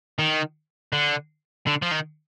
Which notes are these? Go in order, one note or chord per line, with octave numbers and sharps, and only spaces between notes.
D#3
D3
D3
F3
D#3